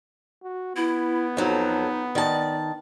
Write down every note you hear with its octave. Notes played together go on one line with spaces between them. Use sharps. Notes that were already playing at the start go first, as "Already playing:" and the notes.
F#4
B3 E4
F2 F#3 D#4 A4
D#3 D5 A5